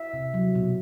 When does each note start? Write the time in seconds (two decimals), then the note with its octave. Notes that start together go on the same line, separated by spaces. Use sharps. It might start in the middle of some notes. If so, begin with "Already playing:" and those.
Already playing: E5
0.13 C3
0.34 F#3
0.55 B2